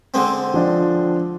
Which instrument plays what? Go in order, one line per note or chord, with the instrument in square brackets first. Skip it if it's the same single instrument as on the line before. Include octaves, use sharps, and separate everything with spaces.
[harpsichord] D3 G#3 C4
[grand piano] F3 D4